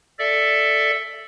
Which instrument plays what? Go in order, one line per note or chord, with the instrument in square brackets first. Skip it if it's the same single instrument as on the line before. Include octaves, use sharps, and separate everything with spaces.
[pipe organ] A4 D5 E5